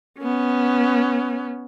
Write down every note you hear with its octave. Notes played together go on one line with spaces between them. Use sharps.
B3 C#4